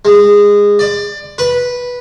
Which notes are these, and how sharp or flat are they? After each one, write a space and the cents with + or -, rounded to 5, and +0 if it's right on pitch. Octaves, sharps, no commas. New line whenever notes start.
G#3 -20
D5 +20
B4 -10